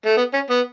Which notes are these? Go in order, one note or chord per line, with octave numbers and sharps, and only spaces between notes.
A3
B3
C#4
B3